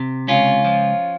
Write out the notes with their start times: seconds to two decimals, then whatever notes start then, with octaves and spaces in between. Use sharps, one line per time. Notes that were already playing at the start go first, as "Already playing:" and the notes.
Already playing: C3
0.28 C#2 C#4 F4
0.65 F3